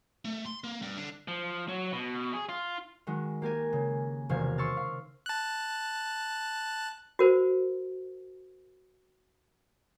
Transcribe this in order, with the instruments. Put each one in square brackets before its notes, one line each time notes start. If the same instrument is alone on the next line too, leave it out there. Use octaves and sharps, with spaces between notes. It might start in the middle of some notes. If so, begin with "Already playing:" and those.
[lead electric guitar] A3
C6
A#3
G2
D3
F3
F#3
B2
G#4
F4
[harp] D#3 G#3 F#4
A#3 G4 A#4 G#5
C#3
E1 C3 D#3 F5 G#6
C6 C#6 E6 F6 A6
F5
[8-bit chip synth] A5 F#6
[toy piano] F#4 A#4 C5